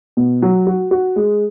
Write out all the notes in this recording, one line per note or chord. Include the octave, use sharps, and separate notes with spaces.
B2
F#3
F#4
F#4
G#3